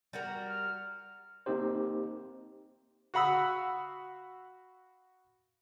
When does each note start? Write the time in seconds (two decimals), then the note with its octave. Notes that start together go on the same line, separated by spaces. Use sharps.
0.13 G3 F#4 A#4
0.49 F6
1.46 A#3 C4 D#4 G4 C5
3.14 F#4 F5 F#5 B5 D#6 E6